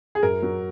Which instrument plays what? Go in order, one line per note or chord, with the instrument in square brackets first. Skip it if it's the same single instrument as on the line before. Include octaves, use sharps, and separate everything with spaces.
[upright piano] G#4
F#2 A#4
F#3